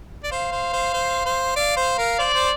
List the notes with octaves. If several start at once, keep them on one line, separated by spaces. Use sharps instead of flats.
D5
C5 F5
C5
C5
C5
C5
D5 F5
C5
A#4
C5 D5
C5